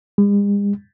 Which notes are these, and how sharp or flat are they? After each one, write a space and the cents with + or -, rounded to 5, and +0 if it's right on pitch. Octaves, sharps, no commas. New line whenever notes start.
G#3 -45